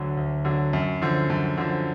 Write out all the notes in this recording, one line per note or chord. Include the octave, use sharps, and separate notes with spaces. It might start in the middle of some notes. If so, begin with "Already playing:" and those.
Already playing: D2 D3 F#3
D2
D3 F#3
F#2
D3 F3
F#2
D3 F3